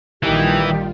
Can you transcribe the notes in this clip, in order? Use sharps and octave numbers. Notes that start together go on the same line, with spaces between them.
A#1 D#3 E3 G3 D#4 F4 G4 G5